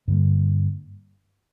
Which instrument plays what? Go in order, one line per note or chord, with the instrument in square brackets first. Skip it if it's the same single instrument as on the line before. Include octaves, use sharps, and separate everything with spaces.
[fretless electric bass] G2 D3 G3 A#3